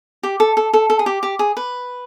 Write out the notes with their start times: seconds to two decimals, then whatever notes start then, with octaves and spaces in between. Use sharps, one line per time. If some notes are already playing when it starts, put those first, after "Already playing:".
0.23 G4
0.40 A4
0.57 A4
0.73 A4
0.90 A4
0.99 G#4
1.06 G4
1.23 G4
1.39 G#4
1.57 B4